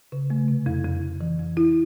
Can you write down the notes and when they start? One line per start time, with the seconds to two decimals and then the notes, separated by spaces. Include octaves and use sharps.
0.12 C#3
0.30 A3
0.48 C3
0.66 F2
0.84 F2
1.02 F2
1.21 E3
1.39 F2
1.57 E4